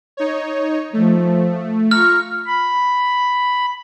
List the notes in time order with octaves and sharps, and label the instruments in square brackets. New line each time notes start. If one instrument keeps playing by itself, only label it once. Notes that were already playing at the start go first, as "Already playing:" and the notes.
[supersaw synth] D#4 C#5
[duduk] F3 [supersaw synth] A3
[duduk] F4 [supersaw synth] A#5 C#6 [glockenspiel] F6
[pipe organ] B5